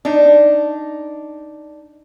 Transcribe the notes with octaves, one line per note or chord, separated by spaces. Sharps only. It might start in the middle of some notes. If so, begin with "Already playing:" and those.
D4 D#4